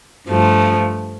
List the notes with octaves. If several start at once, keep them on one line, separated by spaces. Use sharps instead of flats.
G2 F3 A3